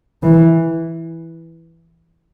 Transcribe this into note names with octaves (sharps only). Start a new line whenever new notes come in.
E3